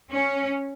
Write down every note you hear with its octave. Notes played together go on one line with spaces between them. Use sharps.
C#4